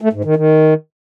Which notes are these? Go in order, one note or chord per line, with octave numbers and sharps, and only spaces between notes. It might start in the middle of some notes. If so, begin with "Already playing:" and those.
A3
G#2
D#3
D#3